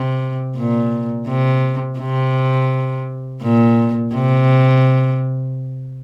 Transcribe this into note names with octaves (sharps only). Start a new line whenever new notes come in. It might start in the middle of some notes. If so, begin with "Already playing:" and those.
Already playing: C3
A#2
C3
C3
A#2
C3